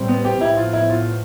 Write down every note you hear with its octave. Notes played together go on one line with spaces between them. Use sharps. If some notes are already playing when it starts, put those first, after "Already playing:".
Already playing: A2 G3 C4
B3
G4
A2 F3 B3 E4
F4
E4
F4